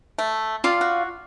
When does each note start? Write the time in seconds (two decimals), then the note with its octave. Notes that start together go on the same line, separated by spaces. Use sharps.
0.18 A3
0.64 G3 F4 D5 F5
0.81 F#4